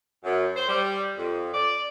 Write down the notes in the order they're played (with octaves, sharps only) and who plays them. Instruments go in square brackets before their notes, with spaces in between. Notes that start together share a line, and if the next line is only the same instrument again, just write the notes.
[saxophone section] F#2
C5
G3
F2
D5